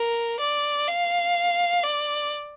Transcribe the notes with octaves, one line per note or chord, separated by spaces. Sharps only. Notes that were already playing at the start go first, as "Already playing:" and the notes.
Already playing: A#4
D5
F5
D5